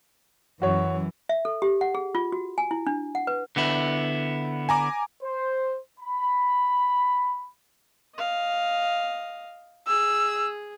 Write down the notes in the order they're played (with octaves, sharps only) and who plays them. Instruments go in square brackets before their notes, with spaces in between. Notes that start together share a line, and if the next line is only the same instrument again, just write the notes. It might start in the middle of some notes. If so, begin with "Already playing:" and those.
[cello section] F#2 E3 [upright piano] F#4 C#5
[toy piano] E5
A4
G4
F#5
G#4
F4
F#4
G#5
E4
D4
F#5
B4
[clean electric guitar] D3 B3 E4
[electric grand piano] G#5 A#5 D6
[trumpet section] C5
B5
[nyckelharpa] D#5 F5
[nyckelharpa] G#4 [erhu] E6